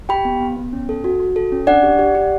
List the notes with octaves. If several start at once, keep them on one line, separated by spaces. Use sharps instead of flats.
G4 G5 B5
B3
B3
B3
C#4
A4
F#4
F#4
A4
C#4
D4 D5 F#5
G4
G4
G4